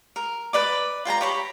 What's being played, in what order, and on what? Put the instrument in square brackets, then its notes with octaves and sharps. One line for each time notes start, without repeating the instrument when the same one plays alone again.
[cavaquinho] A#4
B4 D5 D6
F4 G5 A5 A#5
G4 C#5 B5